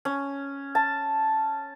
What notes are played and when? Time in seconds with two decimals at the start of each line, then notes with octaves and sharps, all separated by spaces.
0.05 C#4
0.75 A5